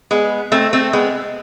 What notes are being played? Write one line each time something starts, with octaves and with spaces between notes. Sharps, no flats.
G#3 B3
A3 C4
A3 C4
G#3 B3